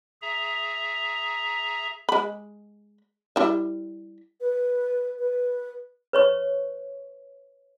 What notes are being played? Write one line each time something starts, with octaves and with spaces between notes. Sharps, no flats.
G#4 E5 A#5
G#3 B5
G3 E4 E5
B4
B4
B4 C#5 C#6